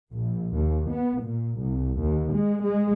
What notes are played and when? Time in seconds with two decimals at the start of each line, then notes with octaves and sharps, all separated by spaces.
0.12 A#1
0.56 D#2
0.90 B3
1.22 A#2
1.60 C2
2.00 D#2
2.34 G#3
2.64 G#3